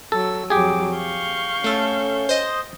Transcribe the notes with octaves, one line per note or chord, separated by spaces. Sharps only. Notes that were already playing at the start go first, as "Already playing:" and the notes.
F#3 A4 E6
F2 F#3 G4 G#4 D6
F5 C#6 G6
A3 C#4 A4
C5 D#5